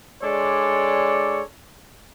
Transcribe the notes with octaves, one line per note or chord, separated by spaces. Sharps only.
G#3 D4 A4 C#5 D5